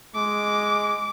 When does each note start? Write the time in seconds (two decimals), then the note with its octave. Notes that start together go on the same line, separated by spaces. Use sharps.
0.16 G#3 D6